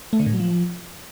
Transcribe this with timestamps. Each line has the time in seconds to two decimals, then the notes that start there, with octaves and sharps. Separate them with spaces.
0.13 A3
0.20 D3
0.26 A2
0.33 F#3
0.40 F3